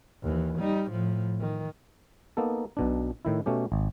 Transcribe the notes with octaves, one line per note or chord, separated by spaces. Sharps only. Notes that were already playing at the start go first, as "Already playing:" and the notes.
D#2 E3
G3 D#4
A2 F3
D#3
A#3 B3 D#4 A4
B1 B2 D4
A2 D#3 E4
B2 A3 C#4 G4
G#1